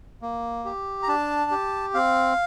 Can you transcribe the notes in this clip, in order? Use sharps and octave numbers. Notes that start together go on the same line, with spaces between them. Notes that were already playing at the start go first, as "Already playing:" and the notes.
A#3
G4
A#5
D4 A5
G4
C4 F5